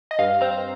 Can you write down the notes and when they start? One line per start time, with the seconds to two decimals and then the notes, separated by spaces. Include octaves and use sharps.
0.11 D#5
0.19 G2 F5
0.41 C4 A#5